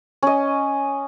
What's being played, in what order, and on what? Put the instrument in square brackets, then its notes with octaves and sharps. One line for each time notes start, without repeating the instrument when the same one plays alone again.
[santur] C#4 D#5